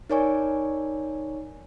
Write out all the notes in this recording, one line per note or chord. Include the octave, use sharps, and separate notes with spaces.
D#4 A#4 C#5 D5 G#5 C#6